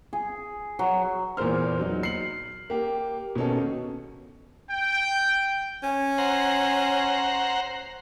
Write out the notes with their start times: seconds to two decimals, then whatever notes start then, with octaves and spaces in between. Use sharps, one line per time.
0.13 G#4
0.79 F#3
1.37 E2 A#2 A#3 C5 F6
1.79 F#3 D#4
2.03 C7 C#7 F#7
2.70 A#3 G4
3.35 B2 D#3 A#3 C#4 D#4 A4
4.70 G5
5.83 C#4
6.18 C5 F#5 A#5